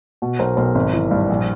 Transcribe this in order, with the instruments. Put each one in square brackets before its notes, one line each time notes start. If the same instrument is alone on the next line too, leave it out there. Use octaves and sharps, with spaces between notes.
[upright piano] B2 F#4
B1 A#4 C5
B1 A#4 C5
G#1
E3
G2
A#1